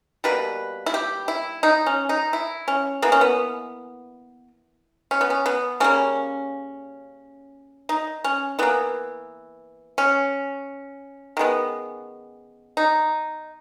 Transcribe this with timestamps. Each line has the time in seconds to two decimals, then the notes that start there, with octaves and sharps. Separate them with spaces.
0.24 B2 G3 A#3 B4
0.86 E4
0.94 G4
1.28 E4
1.63 D#4
1.86 C#4
2.09 D#4
2.33 E4
2.68 C#4
3.02 E3 A#3 B3
3.12 C#4
3.21 B3
5.11 C#4
5.21 B3
5.30 C#4
5.46 B3
5.80 C#3 G3 A#3 C#4
7.89 D#4
8.24 C#4
8.59 E3 A#3 B3
9.98 C#4
11.37 D#3 G#3 B3
12.77 D#4